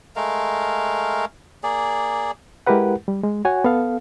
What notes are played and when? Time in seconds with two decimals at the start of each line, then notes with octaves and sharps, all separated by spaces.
0.16 G#3 A3 A#4 F5
1.63 A#3 G#4 D5
2.67 G#3 E4 G4 A#4 B4 F#5
3.08 G3
3.23 G#3
3.45 F#4 C#5 F#5 G#5
3.64 B3 A4 F5